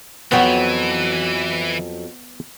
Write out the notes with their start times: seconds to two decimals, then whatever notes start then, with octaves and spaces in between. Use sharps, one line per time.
0.32 F2 E3 F#3 B3 F#4 C#5 G5